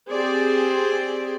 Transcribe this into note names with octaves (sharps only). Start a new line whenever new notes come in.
C4 G4 G#4 C5 D5